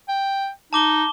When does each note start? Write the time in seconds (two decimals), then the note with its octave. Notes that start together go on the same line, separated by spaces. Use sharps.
0.08 G5
0.73 D#4 A5 D6 G7